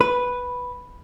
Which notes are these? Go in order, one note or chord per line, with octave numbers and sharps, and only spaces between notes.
B4